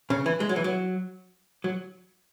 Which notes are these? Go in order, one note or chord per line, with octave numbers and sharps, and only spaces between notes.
C#3
E3
G#3
F#3
E3
F#3
F#3